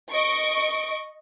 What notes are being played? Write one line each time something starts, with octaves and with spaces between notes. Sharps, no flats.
D#5 C#6 D7